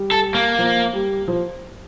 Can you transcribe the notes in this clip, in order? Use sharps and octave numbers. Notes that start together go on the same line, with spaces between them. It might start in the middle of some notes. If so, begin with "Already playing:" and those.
Already playing: G3
A4
A#3
F3
G3
F3